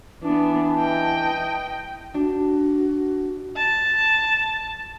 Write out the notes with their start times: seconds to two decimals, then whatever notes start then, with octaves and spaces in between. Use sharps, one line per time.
0.23 E3 B3 D4 A5
0.80 D#5 G5
2.14 D4 F#4
3.56 A5